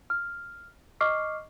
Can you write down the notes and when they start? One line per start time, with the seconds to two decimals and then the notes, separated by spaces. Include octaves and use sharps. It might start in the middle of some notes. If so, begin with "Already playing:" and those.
0.10 F6
1.01 D#5 C#6 D6 F6 C7